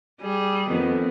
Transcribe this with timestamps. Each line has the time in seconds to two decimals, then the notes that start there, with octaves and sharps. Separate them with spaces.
0.21 G3 G#4
0.69 F2 D#3 B3